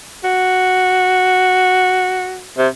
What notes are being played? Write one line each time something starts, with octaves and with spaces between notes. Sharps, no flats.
F#4
C3